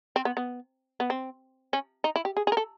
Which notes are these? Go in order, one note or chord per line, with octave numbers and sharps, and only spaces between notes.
C4
B3
B3
B3
C4
C#4
D#4
E4
G4
G#4
G#4
A#4
A4